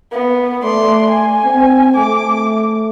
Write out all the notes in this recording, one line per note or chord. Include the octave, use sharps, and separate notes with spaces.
B3
A3 D5 C6
G#5
C4
A3 D6